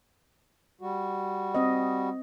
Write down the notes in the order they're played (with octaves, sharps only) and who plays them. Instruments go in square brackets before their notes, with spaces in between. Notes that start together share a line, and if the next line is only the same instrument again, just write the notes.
[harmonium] G3 F#4
[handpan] C4 D#5